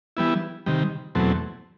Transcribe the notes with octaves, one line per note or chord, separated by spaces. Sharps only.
E3 G3 B3 E4
C3 D#3 G3
E2 B2 F#3 A3 C4